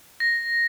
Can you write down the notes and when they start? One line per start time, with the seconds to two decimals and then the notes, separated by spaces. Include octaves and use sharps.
0.20 A#6